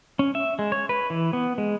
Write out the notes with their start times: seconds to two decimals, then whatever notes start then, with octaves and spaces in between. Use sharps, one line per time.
0.19 C#4
0.35 E5
0.59 G#3
0.72 C#5
0.89 B4
1.10 E3
1.33 B3
1.58 G#3